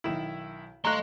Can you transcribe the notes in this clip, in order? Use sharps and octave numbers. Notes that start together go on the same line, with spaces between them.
B1 D#3 E4 E7 F#7
G#1 A3 D#5 F5 A#5 C6 C#6 F#6